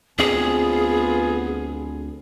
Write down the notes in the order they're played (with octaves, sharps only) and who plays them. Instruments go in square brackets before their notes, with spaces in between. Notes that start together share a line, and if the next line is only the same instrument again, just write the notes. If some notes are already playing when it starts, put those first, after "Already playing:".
[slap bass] D2 C4 [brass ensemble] B3 F4 G#5 [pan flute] G#4